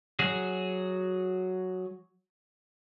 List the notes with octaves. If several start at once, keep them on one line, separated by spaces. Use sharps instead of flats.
F#3 F#4 G#4